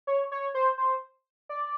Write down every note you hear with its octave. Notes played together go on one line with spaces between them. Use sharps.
C#5
C#5
C5
C5
D5